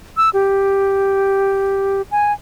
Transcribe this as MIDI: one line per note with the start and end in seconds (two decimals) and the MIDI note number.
0.17 0.30 88
0.34 2.02 67
2.11 2.33 80